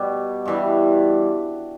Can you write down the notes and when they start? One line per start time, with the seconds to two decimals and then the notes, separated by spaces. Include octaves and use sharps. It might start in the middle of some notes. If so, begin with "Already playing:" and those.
Already playing: B2 G3 G4
0.45 G2 E3 G3